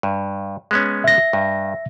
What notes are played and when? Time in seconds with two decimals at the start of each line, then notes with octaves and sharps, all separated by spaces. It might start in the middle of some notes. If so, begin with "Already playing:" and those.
0.03 G2
0.71 G#3 B3 C#4
1.04 E5 A#6
1.33 G2